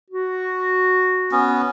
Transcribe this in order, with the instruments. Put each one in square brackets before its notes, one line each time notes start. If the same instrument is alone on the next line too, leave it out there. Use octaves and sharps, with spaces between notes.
[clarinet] F#4
[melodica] B3 C#4